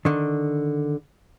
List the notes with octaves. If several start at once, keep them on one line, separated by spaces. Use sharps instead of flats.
D3 D#3